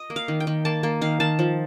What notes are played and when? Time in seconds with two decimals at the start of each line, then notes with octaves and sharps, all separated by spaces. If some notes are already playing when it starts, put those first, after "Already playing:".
Already playing: D#5
0.10 A#3
0.16 F5
0.28 D#3
0.40 G5
0.47 D#3
0.65 A#3 A5
0.83 A#3
1.01 D#3 F5
1.20 D#3 A5
1.39 F3